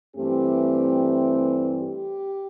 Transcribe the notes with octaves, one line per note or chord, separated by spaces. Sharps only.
G2 E3 A3 C4 G4
G4